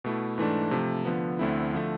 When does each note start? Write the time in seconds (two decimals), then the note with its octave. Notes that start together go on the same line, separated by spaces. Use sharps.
0.04 B2 A3 E4
0.38 G#2 E3 A3 D4
0.71 C3 F3 A3
1.05 D3 F3 B3
1.39 D2 D3 A3 C4 E4
1.73 D3 F3 A3